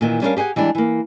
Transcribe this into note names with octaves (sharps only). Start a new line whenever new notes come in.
A#2 D#3 E3
G3 C#4 D4 F#4 A#4 F5
G4 G#4 C5 F#5 G#5
E3 G3 G#3 D4
E3 A#3